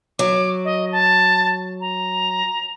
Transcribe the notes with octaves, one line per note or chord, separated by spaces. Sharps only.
F#3 D6
D#5
A5
A#5